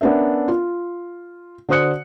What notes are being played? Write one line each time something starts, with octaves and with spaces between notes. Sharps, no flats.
B3 C#4 D4 A#4 E5
F4
D3 F#4 C5 D#6 F#6 C#7